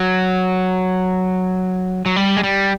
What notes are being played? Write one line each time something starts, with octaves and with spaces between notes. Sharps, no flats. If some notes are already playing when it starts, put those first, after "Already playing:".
Already playing: F#3
F#3
G3
G#3
G3